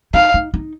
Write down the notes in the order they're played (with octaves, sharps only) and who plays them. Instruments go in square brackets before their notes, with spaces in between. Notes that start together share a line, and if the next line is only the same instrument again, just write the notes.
[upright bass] D#4 [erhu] F5
[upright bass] D#4
D#4